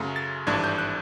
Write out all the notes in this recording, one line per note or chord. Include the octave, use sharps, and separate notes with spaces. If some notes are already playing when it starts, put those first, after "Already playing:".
Already playing: F#2 C#3 F#3 A3
A6
G#1 G2 E3 A3 D4 G#6
G6
F#6